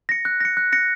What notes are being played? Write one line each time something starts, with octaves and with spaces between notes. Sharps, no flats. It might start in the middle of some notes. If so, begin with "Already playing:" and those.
A#6 C#7
F#6
A#6 C#7
F#6
A#6 C#7